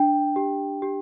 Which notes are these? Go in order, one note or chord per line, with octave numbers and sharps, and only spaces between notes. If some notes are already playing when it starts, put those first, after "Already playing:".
Already playing: D4 G5
G4
G4